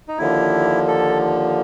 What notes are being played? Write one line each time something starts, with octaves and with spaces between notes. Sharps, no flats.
D#4
D#2 D3 F3 E4
A4